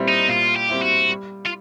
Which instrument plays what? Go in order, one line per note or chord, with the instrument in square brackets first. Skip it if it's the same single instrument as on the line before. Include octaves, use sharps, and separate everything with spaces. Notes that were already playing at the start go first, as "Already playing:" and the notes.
Already playing: [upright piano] A#2 G3 C4 E4
[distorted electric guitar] D#4
[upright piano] A#2 [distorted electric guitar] F4
[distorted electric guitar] G4
[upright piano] G3 C4 E4
[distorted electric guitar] F#4
[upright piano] G3
[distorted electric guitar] F4